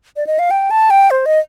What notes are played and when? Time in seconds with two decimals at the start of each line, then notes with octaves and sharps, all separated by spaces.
0.16 D5
0.27 D#5
0.39 F5
0.51 G5
0.71 A5
0.90 G5
1.11 C5
1.26 D#5